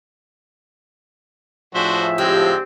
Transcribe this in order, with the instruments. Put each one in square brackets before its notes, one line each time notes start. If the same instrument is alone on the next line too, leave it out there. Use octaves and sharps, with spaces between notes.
[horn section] A2 F3 [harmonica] D4 F#4 C5 [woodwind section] G#4 E5
[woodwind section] G#2 D3 C4 [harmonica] G#3 E6 [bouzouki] G4